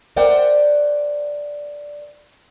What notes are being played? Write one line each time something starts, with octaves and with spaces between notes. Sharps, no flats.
A#4 C5 D5 E5 F#5 G5